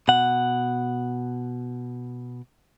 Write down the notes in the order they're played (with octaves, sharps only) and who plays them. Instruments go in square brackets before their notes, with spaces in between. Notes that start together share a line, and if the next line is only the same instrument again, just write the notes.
[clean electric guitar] B2 F#5